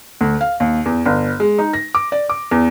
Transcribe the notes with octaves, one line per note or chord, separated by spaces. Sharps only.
D2
F5
D#2
E2
G1
G#3
D#4
A#6
D6
D5
D6
E2